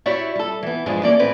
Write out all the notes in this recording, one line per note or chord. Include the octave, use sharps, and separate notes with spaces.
E4 F#4 G4 C#5 D5 E5
G3 A4
E3 B3
G2 F3 G3 G#3 G#4
E3 A#3 C#4 A4 D5
A2 C4 G#4 B4